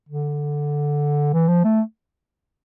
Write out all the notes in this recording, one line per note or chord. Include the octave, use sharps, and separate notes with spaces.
D3
E3
F3
A3